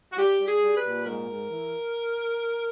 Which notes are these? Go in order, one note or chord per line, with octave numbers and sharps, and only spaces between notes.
F#4
G3 G4
G3
G#4
G3
B4
A#2
G#2 A#4
G#2
E3